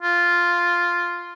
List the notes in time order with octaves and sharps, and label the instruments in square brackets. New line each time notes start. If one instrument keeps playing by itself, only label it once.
[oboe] F4